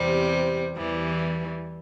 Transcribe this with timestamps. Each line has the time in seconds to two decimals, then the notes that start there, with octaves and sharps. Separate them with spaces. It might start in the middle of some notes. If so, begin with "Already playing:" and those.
Already playing: E2 C3 G3 C4
0.76 E2 E3 G3